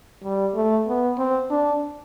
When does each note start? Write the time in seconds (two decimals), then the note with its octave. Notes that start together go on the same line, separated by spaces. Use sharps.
0.24 G3
0.55 A3
0.87 B3
1.18 C4
1.50 D4